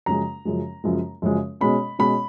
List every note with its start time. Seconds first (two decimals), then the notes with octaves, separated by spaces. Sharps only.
0.06 F#2 C#3 F3 G#3 A#5
0.45 F#2 C#3 F3 G#3
0.84 F#2 C#3 F3 G#3
1.22 F#2 C#3 F3 G#3
1.61 B2 G#3 C#4 B5
1.99 B2 G#3 C#4 B5